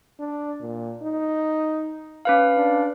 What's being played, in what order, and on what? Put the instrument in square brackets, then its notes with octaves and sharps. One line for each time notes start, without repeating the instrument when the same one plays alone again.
[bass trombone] D4
A#2
D#4
[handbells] C#4 B4 F5
[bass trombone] D4